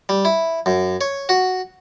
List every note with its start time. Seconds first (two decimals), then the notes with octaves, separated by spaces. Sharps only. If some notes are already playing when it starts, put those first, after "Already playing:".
0.09 G3
0.25 E4
0.66 F#2
1.01 C#5
1.29 F#4